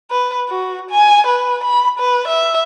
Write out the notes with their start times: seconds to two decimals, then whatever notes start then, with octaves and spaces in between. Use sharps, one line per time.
0.11 B4
0.49 F#4
0.91 G#5
1.27 B4
1.64 B5
1.99 B4
2.28 E5